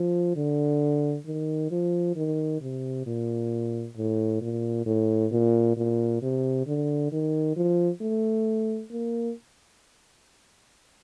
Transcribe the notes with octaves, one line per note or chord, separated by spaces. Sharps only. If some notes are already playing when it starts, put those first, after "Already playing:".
Already playing: F3
D3
D#3
F3
D#3
C3
A#2
A2
A#2
A2
A#2
A#2
C3
D3
D#3
F3
A3
A#3